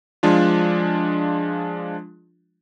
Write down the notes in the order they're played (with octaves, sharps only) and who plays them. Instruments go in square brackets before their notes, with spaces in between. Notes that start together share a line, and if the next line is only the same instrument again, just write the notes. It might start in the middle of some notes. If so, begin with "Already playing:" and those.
[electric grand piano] F3 G#3 D4 F4